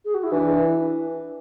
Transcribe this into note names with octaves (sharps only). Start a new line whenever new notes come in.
G#4
F#4
E4
E3 D4